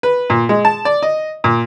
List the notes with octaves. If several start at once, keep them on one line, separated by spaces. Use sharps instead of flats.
B4
A#2
G#3
A5
D5
D#5
A#2